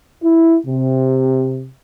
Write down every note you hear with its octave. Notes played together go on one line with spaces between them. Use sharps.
E4
C3